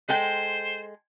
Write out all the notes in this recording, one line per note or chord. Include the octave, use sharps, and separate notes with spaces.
G#3 A4 C5 G5